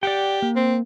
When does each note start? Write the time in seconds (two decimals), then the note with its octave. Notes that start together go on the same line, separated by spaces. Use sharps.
0.03 G4 D5 F#5 G5
0.42 A#3
0.56 C4